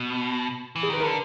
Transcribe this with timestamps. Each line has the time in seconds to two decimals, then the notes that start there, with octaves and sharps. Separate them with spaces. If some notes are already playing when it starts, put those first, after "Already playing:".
Already playing: B2
0.76 E3
0.83 G#4
0.90 D#3 B4
1.00 A#4
1.04 D3